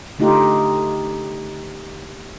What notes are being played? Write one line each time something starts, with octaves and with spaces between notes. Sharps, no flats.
D3 A3 D#4 F4 G4